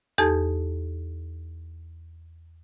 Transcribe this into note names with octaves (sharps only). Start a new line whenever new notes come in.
E2 D#4 G4 A4 A5 G#6